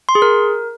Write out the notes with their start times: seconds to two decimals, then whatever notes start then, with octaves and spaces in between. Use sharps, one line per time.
0.09 C6
0.15 G#4
0.22 A#4